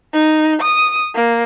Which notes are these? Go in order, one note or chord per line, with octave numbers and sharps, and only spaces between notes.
D#4
D#6
A#3